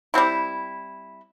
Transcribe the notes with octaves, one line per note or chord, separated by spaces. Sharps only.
G3 C4 E4